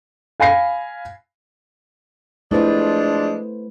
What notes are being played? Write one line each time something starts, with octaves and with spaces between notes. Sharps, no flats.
F5 G#5 B5 A#6 C7
F3 G#3 A3 D4 E4 B4 C5